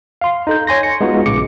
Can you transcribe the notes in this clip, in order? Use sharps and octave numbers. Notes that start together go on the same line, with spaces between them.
F5 C6
D#4 A4 G6
C#5 G#5 C6 A#6
C#7
G#3 B3 D#4 F4 F#4
A#1 A2 C#3 D6 C#7